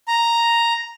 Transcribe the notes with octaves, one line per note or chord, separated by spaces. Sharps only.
A#5